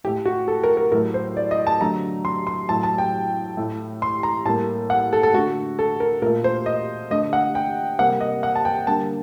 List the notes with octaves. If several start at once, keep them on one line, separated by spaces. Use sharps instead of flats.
A2 A3 G4
F#4
A4
A#4
A#4
A2 F#3 A3 A#4
C5
D5
D#5
A5
D3 F#3 A3 A#5
C6
C6
A2 F#3 A3 A5
A5
G5
A2 A3
C6
A#5
A2 G3 A#3 A5
F#5
A4
A4
D3 A3 F#4
A4
A#4
A#2 A3 A#4
C5
D#5
D3 A3 D#5
F#5
G5
C3 G3 A#3 F#5
D#5
F#5
A5
G5
D3 G3 A#3 A5